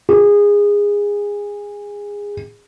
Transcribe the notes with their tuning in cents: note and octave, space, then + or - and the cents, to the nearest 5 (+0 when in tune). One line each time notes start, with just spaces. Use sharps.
G#4 -20